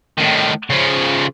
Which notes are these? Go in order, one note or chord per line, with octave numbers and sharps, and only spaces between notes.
A2 D#3
C#3 F3